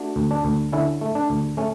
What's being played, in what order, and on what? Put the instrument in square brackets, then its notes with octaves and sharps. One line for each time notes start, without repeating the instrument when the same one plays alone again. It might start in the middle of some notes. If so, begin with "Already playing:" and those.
Already playing: [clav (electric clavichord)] A3 D4 F#4
D2
D4
D2
D3 C#4 E4
A3
D4
D2
A3 C#4